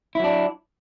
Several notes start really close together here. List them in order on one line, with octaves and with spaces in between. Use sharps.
E4 F#3 D4